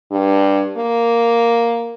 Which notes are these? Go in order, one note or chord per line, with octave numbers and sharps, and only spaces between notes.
G2
A#3